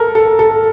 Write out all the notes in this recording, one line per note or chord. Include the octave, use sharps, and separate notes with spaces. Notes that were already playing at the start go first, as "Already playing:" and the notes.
Already playing: A4 A#4
A4
A4